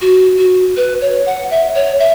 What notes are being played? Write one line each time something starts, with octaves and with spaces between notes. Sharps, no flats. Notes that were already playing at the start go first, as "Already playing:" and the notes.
F#4
F#4
B4
C#5
F#5
E5
C#5
E5